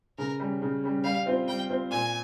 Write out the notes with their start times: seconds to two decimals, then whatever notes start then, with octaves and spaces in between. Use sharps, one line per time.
0.18 C#3 A#4
0.40 G3 C#4
0.62 C#3
0.84 G3 C#4
1.04 G3 F5
1.26 C4 F4 C5
1.48 G3 G5
1.69 C4 F4 C5
1.91 A#2 G#5